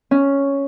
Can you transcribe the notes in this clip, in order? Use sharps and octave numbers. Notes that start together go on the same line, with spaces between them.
C#4